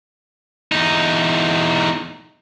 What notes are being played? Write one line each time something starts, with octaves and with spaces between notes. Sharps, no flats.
E2 D#4